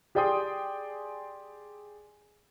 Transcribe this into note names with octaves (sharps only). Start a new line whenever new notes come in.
G4 G#4 D5 G5 C6 D#6